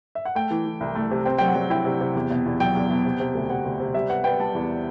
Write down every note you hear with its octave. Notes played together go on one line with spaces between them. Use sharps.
E5
F#5
A3 G5
E3
E3
C2
A3
C3
C4 G5
F#3 G5
F#5
F#3
E4 G5
C3
C3
E2
B2
E2
F#3 G5
E2
B2
C3
C3
D2
C3 F#5
D2
C3
G3 E5
B3 F#5
B3 G5
G3 A5
E2